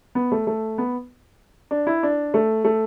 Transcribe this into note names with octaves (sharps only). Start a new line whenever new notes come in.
B3
A3
A3
B3
D4
E4
D4
A3
A3